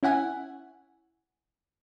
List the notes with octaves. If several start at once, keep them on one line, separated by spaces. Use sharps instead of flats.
C#4 E4 F#5 G#5